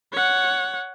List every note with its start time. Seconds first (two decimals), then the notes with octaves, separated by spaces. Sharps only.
0.13 C#5 F#5